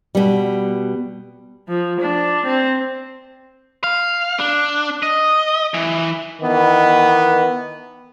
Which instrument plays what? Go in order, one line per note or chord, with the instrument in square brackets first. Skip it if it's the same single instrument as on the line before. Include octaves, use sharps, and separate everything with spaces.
[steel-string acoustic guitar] B2 G3
[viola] F3
D4
C4
[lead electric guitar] F5
D4
D#5
E3
[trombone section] D#3 E3 B3